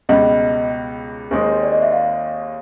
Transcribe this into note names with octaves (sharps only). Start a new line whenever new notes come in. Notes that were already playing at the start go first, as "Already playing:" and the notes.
C#2 B2 G3 D#5
D#2 D#3 G#3 C4 D#4
D5
D#5
E5
F5